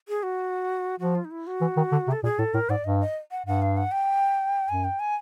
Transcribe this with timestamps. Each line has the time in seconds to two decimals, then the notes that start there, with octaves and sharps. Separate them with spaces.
0.08 G#4
0.23 F#4
1.00 F3 F#4
1.15 F4
1.25 D#4
1.31 E4
1.47 F#4
1.61 E3
1.77 D#3
1.92 D3
2.08 C3
2.12 A4
2.23 A#2 G#4
2.39 A2 A4
2.54 A2 A#4
2.70 G#2 D5
2.84 G2 D#5
3.00 D#5
3.31 F#5
3.46 G2 F#5
3.62 F5
3.77 F#5
3.92 G5
4.69 F#2 G#5
4.84 G5
4.99 G#5